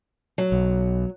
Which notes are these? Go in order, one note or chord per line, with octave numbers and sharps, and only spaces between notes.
F#3
B1